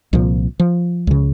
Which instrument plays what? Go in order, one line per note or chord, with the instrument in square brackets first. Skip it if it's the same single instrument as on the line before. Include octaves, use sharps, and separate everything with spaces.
[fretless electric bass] C2 A#2 F3
F3
C#2 C#3